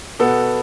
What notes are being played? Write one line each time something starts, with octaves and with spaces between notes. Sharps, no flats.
B2 B3 A4